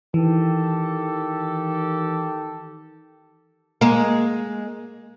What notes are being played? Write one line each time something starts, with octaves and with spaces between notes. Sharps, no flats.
D#3 E3 G4 A4
G#3 A#3